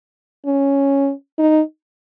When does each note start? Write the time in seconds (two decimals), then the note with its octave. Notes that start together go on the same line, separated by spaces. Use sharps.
0.46 C#4
1.39 D#4